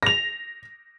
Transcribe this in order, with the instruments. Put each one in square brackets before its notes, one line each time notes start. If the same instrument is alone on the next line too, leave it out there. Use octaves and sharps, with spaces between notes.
[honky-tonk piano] A#6 F7